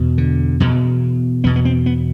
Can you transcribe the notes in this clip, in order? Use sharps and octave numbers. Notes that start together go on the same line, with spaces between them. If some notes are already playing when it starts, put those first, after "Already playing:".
Already playing: E2 B2
D3
E2 B2
E2 B2 B3
B3
C4
B3